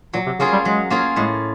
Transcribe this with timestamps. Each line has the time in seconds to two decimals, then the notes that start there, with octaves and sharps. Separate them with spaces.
0.14 A#2 F#3
0.26 C3
0.39 C#3 A#3 C#4 F4 G#4
0.52 G3
0.65 F#3 G#3
0.90 A#3 C#4 F4 G#4
1.16 A2 G#3